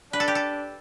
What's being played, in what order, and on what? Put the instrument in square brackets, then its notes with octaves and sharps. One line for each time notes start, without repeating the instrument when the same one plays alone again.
[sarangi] D4 [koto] B4
[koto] A4
G4
A4